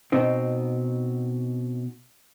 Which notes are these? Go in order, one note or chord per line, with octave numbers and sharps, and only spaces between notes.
B2 C4 D#4